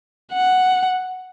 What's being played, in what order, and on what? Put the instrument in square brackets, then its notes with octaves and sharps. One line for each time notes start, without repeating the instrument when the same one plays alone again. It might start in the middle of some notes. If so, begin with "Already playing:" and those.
[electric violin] F#5